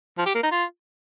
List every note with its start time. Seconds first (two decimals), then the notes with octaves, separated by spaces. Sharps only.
0.18 F3
0.26 G4
0.35 A#3
0.43 D#4
0.52 F4